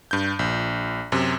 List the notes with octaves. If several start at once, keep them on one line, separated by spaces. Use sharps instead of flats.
G2 G6
A#1
F#2 C3